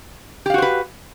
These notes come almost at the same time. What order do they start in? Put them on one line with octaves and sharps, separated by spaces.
G4 F5 F#4 C5 B4